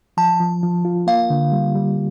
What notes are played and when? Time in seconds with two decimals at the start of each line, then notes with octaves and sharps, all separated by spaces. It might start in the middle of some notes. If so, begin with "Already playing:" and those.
0.17 F3 A5
0.40 F3
0.63 F3
0.85 F4
1.07 A#3 F5
1.30 D3
1.52 G3
1.75 G3